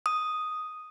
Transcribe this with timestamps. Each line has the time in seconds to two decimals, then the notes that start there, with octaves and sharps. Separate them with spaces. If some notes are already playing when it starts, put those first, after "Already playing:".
0.06 D#6